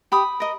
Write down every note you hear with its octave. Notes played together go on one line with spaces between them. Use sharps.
G4 B5 D#6
A#4 D#5